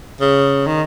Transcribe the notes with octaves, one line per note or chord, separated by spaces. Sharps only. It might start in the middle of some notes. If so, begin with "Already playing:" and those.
C#3
D#3